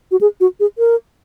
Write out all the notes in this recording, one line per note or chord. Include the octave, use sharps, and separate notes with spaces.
F#4
G#4
F#4
G#4
A#4